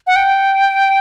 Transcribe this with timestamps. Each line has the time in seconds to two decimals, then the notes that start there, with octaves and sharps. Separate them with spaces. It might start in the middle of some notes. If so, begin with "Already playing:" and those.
0.07 F#5
0.16 G5